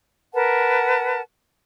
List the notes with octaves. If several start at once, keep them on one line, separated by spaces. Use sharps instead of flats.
A#4 B4 F#5 A5